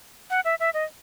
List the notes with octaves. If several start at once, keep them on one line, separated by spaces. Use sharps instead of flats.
F#5
E5
E5
D#5